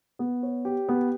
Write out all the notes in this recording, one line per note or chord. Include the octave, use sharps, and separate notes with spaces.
B3
C#5
G4
B3